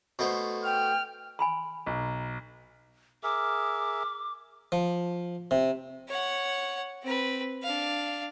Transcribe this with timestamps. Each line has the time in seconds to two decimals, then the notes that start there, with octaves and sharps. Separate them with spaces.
0.19 B2 A3 C5
0.65 G5 F6
1.39 G#5 B5 C6
1.86 B1
3.23 G#4 A#4 E5 D6
4.72 F3
5.51 C3
6.09 C#5 F#5
7.03 C4 B4
7.63 D4 F5